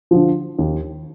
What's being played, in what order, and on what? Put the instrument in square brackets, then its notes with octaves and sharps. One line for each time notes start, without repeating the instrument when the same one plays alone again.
[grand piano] D3 F3
D#2